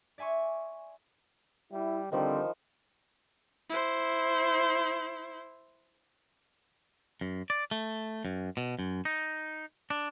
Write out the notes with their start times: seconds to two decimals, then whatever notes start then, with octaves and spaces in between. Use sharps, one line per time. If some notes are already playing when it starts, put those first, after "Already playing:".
0.18 D5 E5 G#5 C6 C#6
1.72 G3 E4
2.12 D3 D#3 F3 G3 C4 B4
3.69 E4 C5
7.21 F#2
7.50 D5
7.71 A3
8.25 F#2
8.57 B2
8.79 F#2
9.05 D#4
9.90 D4